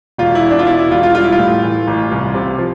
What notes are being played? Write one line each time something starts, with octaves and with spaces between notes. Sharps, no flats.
E1 F4
E4
E2
D4
F4
B2 E4
E4
E1 F4
F4
G3 F4
E4
F4
A2
E3
A1
C2
C3
F3